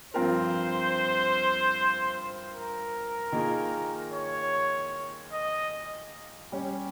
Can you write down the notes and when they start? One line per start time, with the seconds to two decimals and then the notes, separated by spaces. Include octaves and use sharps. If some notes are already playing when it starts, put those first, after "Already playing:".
0.13 G2 F3 C4 F4 A#4 C5
2.53 A#4
3.32 D#3 A#3 F4 G#4
4.13 C#5
5.33 D#5
6.52 G3 C#4 G4